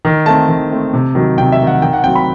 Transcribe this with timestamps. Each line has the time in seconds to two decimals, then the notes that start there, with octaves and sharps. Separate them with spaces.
0.05 D#3
0.26 A3 C4 A5
0.49 D#3
0.71 A3 C4
0.93 C3
1.15 D#3 F#3
1.38 C3 G5
1.52 E5
1.60 D#3 F#3
1.67 F#5
1.82 D#3 G5
1.93 F#5
2.04 F#3 C4 G5
2.15 B5